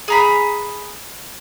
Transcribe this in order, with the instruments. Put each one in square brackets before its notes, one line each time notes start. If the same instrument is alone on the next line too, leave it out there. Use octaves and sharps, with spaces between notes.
[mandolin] G#4 A#5 B5